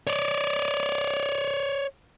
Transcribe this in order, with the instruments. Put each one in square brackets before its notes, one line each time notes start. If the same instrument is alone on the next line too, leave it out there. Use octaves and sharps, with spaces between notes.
[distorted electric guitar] C#5 D5